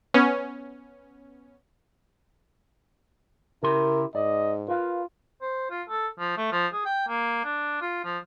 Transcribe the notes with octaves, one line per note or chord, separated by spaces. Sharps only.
B3 C#4
C#3 E4 G4 A#4 C6
G#2 D5 D#5
F4 A#4 B4 F5
C5
F4
A4
F3
A3
F3
G#4
G5
A#3
D4
F4
F3